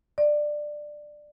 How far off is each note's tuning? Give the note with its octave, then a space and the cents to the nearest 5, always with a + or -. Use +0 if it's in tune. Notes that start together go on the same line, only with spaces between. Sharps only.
D5 +15